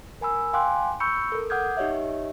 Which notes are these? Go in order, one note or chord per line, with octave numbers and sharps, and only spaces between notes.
A#4 G#5 B5 E6
F5 G5 G#5 C6 D6 F#6
B5 C#6 E6 G6 C#7
A4 A#4
F#5 D6 D#6 F6 G6 G#6
D#4 G4 C#5 D#5 E5